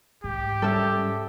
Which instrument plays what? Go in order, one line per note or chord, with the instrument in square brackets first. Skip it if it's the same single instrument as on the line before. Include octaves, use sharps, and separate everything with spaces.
[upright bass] G#2 [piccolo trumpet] G4
[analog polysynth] G3 C#4 [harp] A4 E5